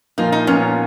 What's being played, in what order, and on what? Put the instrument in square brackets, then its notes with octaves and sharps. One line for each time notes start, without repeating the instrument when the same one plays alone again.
[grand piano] A#2 F3 A#3 F4 [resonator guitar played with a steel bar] D#4
[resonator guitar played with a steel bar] D#4
[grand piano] A#2 F3 B3 F4 A#4 [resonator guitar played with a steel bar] C#4